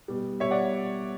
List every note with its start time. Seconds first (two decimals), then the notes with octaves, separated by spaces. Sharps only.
0.08 B2 G3
0.40 B2 G3 C#5 E5
0.51 D5 F#5